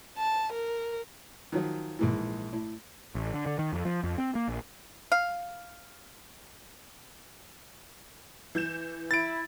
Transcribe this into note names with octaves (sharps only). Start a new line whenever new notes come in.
A5
A#4
D#3 F3 F#3
A#1 G#2 E3
A2
A1
D3
D3
D#3
F2
F3
F2
C4
A#3
A#1
F5
E3 G6 E7
E4 A6 D7